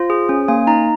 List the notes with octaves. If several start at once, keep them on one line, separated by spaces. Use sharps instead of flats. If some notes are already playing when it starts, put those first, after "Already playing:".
Already playing: F4 C5
G#4
C#4
A#3 G#5
D#4 A#5